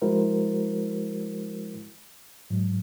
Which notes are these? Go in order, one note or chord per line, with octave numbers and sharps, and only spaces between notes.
F3 G#3 E4 F#4 A#4 C5
G#2 F#3